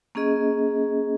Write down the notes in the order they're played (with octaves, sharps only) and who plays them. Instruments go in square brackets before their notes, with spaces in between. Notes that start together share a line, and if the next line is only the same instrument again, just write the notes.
[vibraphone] A#3 C#4 G#4 D#5